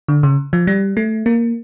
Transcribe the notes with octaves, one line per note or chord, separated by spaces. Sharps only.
D3
C#3
F3
G3
A3
A#3